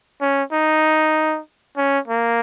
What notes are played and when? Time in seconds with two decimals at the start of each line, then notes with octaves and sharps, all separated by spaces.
0.21 C#4
0.52 D#4
1.77 C#4
2.08 A#3